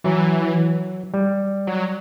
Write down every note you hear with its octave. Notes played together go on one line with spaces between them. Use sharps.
E3 F#3
G3
F#3